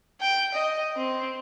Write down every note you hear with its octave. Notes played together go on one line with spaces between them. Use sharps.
G5
D#5
C4